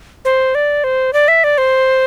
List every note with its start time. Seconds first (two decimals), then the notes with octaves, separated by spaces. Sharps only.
0.25 C5
0.55 D5
0.84 C5
1.13 D5
1.28 E5
1.44 D5
1.58 C5